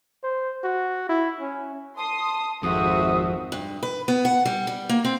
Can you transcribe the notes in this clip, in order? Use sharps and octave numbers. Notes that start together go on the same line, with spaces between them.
C5
F#4
E4
C#4
A5 C6 D#6
G#1 F2 F#4 C5 E5 D#6
G2
B4
B3
F#5
G3
G3
A#3
C4